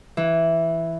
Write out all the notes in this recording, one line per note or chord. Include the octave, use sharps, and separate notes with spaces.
E3